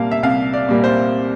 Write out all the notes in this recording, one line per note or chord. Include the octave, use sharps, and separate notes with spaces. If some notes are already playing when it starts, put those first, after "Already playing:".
Already playing: C2 A#2 G3 A#3 F5 A5
E5
C2 F5
D5
A#2 G3 A#3
C5